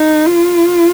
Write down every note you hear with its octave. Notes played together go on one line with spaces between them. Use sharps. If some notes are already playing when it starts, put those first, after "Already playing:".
Already playing: D#4
F4